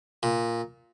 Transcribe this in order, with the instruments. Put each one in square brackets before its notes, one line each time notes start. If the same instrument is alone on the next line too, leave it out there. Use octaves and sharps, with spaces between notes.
[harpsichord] A#2